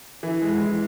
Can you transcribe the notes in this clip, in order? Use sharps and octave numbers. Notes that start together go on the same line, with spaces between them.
E3
G#3
E3